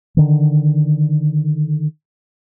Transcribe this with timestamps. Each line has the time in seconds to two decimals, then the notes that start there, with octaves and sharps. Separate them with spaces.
0.17 D3 D#3